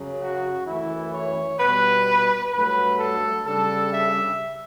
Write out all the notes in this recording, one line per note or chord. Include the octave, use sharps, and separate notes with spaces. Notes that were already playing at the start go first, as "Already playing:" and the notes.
Already playing: F#2 C#3 F#3
F#4
F#2 E3 A3 E4
C#5
B2 G3 B3 B4
G2 F#3 A3 B4
A4
C#3 G3 D4 A4
E5